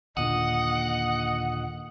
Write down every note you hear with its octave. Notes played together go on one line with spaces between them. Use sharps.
D#2 A#2 D3 D#5 F#5 D#6